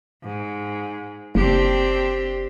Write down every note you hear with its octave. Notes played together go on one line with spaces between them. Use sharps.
G#2
F#1 C4 D4 G4